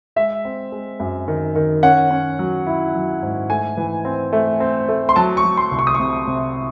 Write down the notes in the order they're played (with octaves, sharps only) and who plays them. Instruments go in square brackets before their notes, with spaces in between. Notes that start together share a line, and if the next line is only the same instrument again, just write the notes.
[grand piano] G#3 E5
C4
G#3
F#2
D#3
D#3
C#4 F#5
C#4
F#3
E4
F#3
G#2
A3 G#5
E3
C4
A3
C4
A3
C6
F#3 A5
C#6
F#3
C6
C2
C#6
D#6
C#6
C3
C3